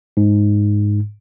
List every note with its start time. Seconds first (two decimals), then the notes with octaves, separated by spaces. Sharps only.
0.17 G#2